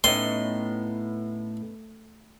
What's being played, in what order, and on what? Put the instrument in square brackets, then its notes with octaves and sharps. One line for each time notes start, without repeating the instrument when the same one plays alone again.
[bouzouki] A2 [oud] B3 C#4 D#4 [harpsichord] C6